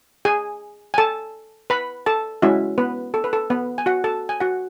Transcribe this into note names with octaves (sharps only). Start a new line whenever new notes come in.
G#4 G#5
G#5
A4 A5
B4 B5
A4 A5
G#3 C#4 E4 F#4 E5
B3 B4
A4
B4
A4
B3 B4
G#5
F#4 F#5
A4 A5
G#5
F#4 F#5